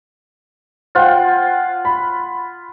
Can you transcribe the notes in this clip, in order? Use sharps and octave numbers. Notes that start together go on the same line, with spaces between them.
F4 C5 F#5 G5
B5